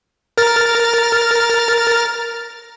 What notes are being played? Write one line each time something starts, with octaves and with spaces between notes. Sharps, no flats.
A#4 F6 A6